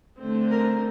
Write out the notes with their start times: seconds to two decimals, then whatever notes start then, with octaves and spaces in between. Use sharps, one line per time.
0.18 D3 A3 C4
0.50 A#4